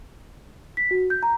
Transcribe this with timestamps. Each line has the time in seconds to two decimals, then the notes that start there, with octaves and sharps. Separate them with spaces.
0.77 B6
0.91 F#4
1.10 G6
1.23 A#5